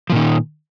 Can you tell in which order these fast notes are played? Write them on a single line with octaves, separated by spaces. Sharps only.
F3 A#2 D#3